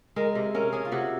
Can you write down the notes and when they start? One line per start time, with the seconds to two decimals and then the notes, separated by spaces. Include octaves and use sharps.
0.16 G#3 A#4
0.35 C3 A#4
0.55 C#4 A#4
0.73 C#4 G#4
0.85 F4
0.92 C3 F#4